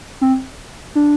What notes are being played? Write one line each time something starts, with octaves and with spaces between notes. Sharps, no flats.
C4
D4